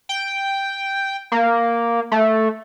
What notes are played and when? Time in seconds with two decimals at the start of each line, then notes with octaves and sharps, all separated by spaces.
0.09 G5
1.32 A#3
2.12 A3